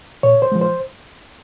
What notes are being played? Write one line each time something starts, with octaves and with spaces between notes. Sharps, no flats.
A#2 C#5
C5
F3 G#3
C5